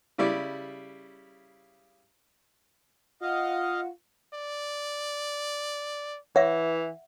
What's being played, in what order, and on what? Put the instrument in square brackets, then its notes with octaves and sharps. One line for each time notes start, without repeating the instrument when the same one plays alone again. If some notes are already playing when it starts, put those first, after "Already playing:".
[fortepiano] C#3 G3 E4 D5
[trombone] F4 [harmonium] D#5 F5 [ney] F#5
[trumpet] D5
[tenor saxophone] E3 [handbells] C#5 [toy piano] E5 F#5